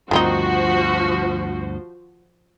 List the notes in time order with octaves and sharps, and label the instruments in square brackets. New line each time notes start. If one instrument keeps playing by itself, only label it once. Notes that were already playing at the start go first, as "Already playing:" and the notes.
[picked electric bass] D2 G2 [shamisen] D#3 C4 D#4 [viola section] F3 C5 [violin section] F#4